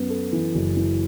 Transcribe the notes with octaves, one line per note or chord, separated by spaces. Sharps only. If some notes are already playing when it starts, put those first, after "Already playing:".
Already playing: F#2 B3
A4
E3
F#1
E3